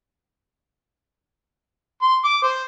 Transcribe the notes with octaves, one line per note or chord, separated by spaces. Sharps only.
C6
D6
C5